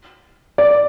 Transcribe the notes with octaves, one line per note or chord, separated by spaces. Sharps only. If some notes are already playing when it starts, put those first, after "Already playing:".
D5